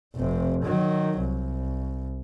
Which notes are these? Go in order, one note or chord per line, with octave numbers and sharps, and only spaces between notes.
F1 C3
D#3 F#3
C2